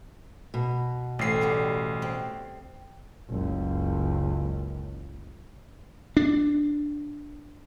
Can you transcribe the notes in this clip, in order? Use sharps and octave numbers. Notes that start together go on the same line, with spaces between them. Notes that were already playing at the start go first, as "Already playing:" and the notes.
B2
A1 A3 C4 C7
G3 B3 D5
C4
F#1 C#2
D4